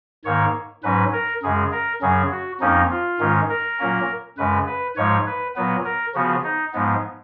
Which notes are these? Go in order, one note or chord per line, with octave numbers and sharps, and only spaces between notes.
G#2 D#3 A#3 C#5
G#2 F#3 C#4 B4
A#4
F#2 C#3 G#3 G#4
A#4
F#2 C#3 F#3 C#4 G#4
F#4
F2 F3 A#3 C#4 D#4
F4
G#2 D#3 G#3 C#4
A#4
A#2 F#3 A#3 C#4
F#2 C#3 G#3 B4
B4
G#2 F3 G#3 C#5
B4
A#2 F#3 B3 B4
A#4
C#3 F3 B3 F#4
D#4
G#2 F3 G#3 B3